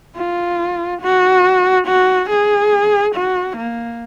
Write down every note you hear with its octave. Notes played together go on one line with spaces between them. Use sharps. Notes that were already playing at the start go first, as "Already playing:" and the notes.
F4
F#4
F#4
G#4
F#4
A#3